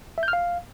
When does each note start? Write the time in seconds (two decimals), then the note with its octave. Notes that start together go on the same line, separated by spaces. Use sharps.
0.18 E5
0.23 G6
0.28 F6
0.33 F5